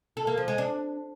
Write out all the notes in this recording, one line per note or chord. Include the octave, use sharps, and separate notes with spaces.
A4
A#3
F3
G#3
D4